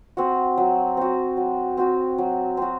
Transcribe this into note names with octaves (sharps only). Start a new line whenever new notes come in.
C4 F#4
F#3
C4 F#4
F#3
C4 F#4
F#3
C4 F#4